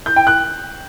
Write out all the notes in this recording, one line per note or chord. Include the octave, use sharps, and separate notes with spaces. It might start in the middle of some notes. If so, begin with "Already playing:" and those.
G6
G5
F#6